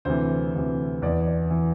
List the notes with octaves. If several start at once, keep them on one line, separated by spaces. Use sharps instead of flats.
D2 C3 E3 C5
D2 C3 E3
E2 E3 D5
D5
E3